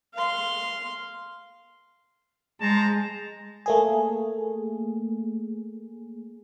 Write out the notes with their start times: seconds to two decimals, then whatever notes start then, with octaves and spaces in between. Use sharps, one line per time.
0.15 F5 C6
2.61 G#3 C5 A5 A#5
3.66 A3 A#3 G#4